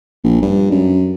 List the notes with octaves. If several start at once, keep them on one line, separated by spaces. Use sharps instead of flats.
A#1
G2
F#2